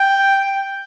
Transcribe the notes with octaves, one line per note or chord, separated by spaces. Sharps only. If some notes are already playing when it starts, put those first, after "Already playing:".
Already playing: G5